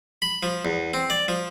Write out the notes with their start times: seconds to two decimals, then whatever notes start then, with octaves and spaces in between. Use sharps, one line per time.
0.22 B5
0.43 F3
0.65 E2
0.94 C4
1.10 D5
1.28 F3